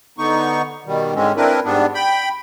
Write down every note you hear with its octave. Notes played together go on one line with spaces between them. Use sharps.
D3 B3 D#4 C#6
B2 D#3 G3
G#2 D3 G#3 C4 C#4
C4 D4 E4 A#4 B4
G#2 G3 B3 D4
G5 B5